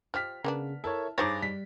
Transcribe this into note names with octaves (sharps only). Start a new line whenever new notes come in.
F3 G4 F6 B6
C#3 A#3 B3 D4
E4 A4 A#4 C#5 E5 A5
G2 D#4 G#4 C5 C#5 D6 A6 A#6
G3 B6